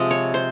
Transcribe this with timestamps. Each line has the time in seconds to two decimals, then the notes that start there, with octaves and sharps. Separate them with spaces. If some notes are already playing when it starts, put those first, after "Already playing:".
Already playing: C3 F3 G#3 D#5
0.11 C#5
0.34 C5